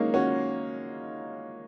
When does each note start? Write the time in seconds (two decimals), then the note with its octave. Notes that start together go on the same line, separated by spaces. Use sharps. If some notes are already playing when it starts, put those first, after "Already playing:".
Already playing: G#3 A#3 C#4 D#4
0.14 C#4 F#4